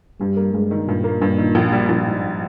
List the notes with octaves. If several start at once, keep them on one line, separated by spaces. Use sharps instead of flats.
G2 G3
A#3
G2 G#3
D#3
G2 A#2
A#3
G2
D#3
A#1
G3
A#1
G#2